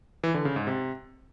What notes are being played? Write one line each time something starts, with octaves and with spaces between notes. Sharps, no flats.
E3
D3
C#3
G#2
C3